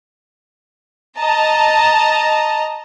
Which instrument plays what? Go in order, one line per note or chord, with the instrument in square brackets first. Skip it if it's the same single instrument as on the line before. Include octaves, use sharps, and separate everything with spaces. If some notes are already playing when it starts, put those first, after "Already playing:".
[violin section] D#5 A5 A#5